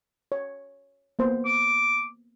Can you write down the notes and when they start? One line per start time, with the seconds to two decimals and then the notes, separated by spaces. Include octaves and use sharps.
0.32 C#5
1.19 A#3 B3 C5
1.46 D6